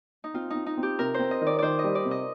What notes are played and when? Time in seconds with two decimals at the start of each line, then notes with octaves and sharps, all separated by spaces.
0.24 D#4
0.34 C4 F4
0.50 C4 D#4
0.66 D#4
0.77 C4
0.83 G4
0.99 C3 A#4
1.14 C4 C5
1.31 D#5
1.41 D#3
1.47 D5
1.59 D#3 C5 D5
1.79 D#5
1.84 G3
1.95 D5
2.05 C3
2.11 D#5